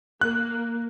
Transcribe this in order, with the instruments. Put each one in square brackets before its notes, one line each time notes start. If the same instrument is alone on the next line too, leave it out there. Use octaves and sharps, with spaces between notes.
[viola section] A#3 [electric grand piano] F#6